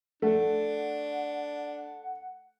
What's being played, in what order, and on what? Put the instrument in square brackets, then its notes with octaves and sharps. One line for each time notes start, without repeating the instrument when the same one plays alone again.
[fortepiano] A3 [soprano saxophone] D4 [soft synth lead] F#5